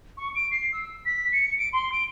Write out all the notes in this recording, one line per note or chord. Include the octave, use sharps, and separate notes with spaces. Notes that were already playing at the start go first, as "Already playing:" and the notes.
C#6
D7
C7
E6
B6
C#7
D7
C6
D7